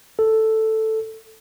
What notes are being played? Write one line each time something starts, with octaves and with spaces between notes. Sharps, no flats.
A4